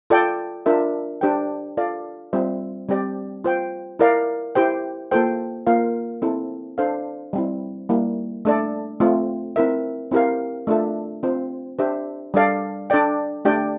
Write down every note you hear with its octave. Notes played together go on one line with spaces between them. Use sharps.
F4 A4 D5 G5
D4 F4 A#4 E5
D4 G4 C5 G5
F4 A4 D5 F5
G3 C4 F4 C5 E5
G3 C4 G4 D5
F4 C5 G5
E4 A#4 D5 F5
E4 G4 C5 G5
A#3 F4 A4 C5 G5
A#3 F4 A#4 F5
C4 E4 A4
D4 A4 C5 F5
G3 C4 E4
G3 A#3 E4
A3 D4 A4 D5
A3 C4 F4
C4 E4 A#4 E5
C4 E4 G4 A#4 F5
A3 D4 F4 A4 E5
C4 F4 C5
D4 G4 C5 E5
G3 D4 A4 D5 F5
D4 A4 D5 G5
A3 D4 G4 D5 G5